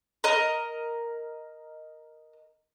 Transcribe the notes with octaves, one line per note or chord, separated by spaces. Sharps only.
A#4 D#5